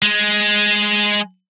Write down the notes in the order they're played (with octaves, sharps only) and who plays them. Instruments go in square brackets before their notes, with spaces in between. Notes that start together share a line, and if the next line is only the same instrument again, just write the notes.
[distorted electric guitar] G#3